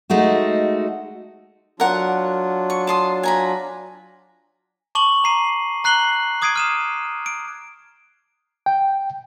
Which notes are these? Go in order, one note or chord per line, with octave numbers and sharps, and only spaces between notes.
G#3 A3 D#4 F#4
F#3 D4 F4 A#4 F#5
C#6
A5 C6 D#6
G#5 A#5 B5
A5 C#6 D6 F#7 G7
A#5 C7 D#7
A#5 F#6 C7 F#7 G7
D6 D#6 G#6 C7 D7 D#7
F6 D#7 E7
D7
G5